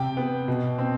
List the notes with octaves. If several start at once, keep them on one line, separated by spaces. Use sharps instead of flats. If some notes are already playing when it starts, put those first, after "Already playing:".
Already playing: C3 G5
B3
B2
C4